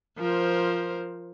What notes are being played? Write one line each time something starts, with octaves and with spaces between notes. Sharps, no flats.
F3 A#4 C5